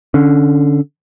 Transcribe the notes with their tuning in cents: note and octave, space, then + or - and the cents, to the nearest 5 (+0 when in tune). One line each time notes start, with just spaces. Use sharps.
D3 +0 C#4 +0